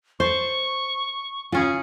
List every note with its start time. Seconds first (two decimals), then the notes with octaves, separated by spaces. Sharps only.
0.20 C5 A5 C#6
1.52 C#3 C#4 F4 G#4